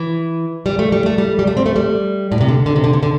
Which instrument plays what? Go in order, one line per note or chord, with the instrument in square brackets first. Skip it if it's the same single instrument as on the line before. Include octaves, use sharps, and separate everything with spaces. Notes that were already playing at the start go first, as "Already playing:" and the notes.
Already playing: [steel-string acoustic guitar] E3
G3
A3
G3
A3
G3
G3
A3
C4
A3
G3
A2
C3
D3
D3
C3
D3
C3
D3